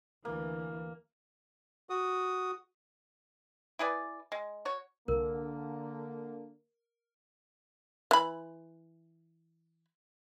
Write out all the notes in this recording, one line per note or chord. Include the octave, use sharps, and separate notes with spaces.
D2 E3 A#3
F#4 D#6
E4 G#4 B4 D5
G#3
F#4 C#5
C2 D3 A#3 A#4
E3 B5